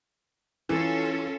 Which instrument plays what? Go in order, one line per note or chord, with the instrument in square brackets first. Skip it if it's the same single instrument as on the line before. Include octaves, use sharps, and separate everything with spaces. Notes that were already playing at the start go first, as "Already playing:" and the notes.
[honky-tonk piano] E3 [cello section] C#4 F4 A4